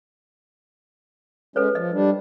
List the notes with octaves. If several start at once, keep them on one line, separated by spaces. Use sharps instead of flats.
G#3 C#4 A4 B4 C#5
F3 D#5
G3 D4